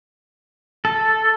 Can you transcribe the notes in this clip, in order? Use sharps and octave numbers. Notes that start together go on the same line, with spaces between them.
A4